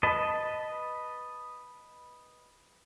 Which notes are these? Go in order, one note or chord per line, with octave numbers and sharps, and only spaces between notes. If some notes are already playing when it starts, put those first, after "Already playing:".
B4 D#5 A5